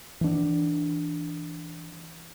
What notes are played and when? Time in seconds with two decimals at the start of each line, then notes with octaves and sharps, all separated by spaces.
0.21 E3 D4